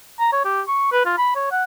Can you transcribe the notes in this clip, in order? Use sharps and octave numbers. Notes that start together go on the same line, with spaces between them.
A#5
C#5
G4
C#6
B4
F4
B5
C#5
F#5